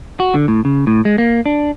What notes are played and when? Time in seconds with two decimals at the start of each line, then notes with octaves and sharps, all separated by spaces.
0.20 F#4
0.34 D3
0.48 A2
0.65 C#3
0.87 A2
1.05 G#3
1.18 A#3
1.46 D4